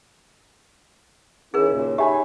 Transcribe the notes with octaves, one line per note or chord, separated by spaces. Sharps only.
D#3 C#4 E4 G#4 A#4
D#2 A#2 C#3
D#4 G4 C#5 E5 G#5 B5